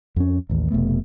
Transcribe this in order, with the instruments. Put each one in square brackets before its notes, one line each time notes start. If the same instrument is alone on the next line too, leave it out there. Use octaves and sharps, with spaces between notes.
[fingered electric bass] F2 C#4
A1 D#2
F1 B2 A3 B3